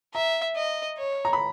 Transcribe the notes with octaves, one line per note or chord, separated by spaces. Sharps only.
E5 A#5
D#5
C#5
A#5
B5